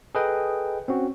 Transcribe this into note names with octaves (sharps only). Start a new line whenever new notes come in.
G#4 A4 B4 D#5 G5
C4 C#4 F#4